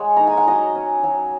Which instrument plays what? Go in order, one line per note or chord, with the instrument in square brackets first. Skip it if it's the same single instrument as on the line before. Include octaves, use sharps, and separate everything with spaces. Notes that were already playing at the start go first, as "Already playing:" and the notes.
Already playing: [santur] G#3 C#5 F#5
D#4 A#5
G#5
F#5
F#3 D#5
C#4
F#3